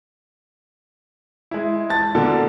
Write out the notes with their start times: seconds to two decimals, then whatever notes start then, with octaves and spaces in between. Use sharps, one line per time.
1.51 G#3 E4
1.90 A5 A6
2.15 B2 D3 A#3 A4